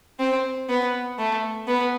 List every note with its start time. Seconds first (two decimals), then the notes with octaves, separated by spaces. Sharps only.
0.19 C4
0.69 B3
1.18 A3
1.67 B3